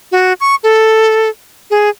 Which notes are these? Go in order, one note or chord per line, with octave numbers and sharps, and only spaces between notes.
F#4
C#6
A4
G#4